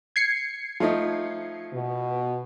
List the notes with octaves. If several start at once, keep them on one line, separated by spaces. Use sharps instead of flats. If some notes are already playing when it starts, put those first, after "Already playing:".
G#6 C7 C#7
F3 A3 D#4
B2